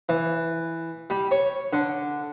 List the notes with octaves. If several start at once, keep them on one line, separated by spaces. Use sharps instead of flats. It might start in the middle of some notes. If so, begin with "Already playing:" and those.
E3
G3
C#5
D3